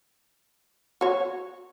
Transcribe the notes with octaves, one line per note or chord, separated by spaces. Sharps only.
F#4 C#5